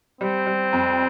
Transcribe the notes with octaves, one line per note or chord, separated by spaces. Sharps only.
G3 C4
G3
F2